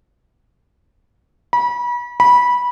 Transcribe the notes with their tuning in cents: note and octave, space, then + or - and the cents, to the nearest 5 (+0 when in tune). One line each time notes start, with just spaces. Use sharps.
B5 -35
B5 -20